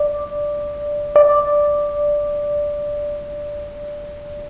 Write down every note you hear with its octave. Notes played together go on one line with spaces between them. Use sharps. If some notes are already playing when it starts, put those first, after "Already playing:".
Already playing: D5
D5